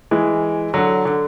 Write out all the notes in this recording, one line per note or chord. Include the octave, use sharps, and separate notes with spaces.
E3 G#3
D3 F#3
D3